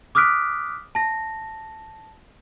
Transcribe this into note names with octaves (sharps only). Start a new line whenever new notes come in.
D6 D#6 F6 F#6 B6 D7
A5 A#6